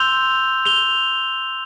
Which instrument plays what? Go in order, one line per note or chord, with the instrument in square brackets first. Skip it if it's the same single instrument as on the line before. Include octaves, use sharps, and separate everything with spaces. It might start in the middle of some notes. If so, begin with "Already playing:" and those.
Already playing: [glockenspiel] C6 E6 G6 F7 G7
F7 G7